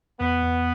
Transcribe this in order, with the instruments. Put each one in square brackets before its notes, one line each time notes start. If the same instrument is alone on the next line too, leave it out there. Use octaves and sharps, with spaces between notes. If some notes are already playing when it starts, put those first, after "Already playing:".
[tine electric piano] E2 [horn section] B3
[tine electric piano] E2